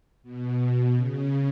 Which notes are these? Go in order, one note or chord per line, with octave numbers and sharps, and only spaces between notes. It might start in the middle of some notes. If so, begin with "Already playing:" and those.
B2
B2
C#3